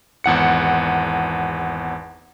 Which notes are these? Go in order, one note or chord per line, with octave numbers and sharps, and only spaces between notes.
G#1 E2 F#5 C#7